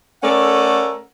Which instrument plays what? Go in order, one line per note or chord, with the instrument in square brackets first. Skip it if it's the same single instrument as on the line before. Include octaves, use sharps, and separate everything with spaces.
[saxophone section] A3 C#4 A4 A#4 D5 F#5